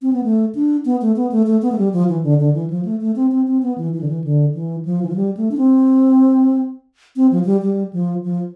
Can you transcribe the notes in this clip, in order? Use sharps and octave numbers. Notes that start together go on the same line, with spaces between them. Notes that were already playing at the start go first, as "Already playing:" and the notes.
C4
B3
A3
D4
B3
A3
B3
A3
A3
B3
A3
G3
F3
E3
D3
D3
E3
F3
A3
A3
C4
C4
C4
B3
E3
E3
D3
E3
D3
E3
F3
E3
F3
G3
A3
D4
C4
C4
F3
F3
G3
G3
F3
F3